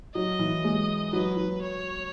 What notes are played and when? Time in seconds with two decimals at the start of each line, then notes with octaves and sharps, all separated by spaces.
0.15 F#3 D#5
0.39 E3
0.64 G#3
1.13 F#3 B4
1.37 F#3
1.62 C#5